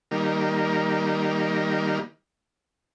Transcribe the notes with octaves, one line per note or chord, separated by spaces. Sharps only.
D#3 G3 A#3